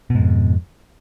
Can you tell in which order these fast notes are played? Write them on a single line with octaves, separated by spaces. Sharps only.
B2 G#2 F2